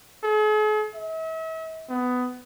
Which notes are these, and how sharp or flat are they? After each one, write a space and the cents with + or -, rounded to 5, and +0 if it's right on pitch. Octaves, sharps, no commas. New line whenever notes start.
G#4 +45
E5 -40
B3 +15